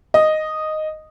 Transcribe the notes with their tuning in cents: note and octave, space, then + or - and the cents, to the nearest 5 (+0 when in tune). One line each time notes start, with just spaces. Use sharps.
D#5 -5